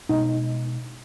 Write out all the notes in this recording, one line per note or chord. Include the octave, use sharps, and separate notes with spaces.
B2 G#3 B3 D#4